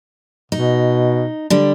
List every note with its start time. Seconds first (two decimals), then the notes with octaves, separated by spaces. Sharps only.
0.52 B2 D#4
1.50 D3 G3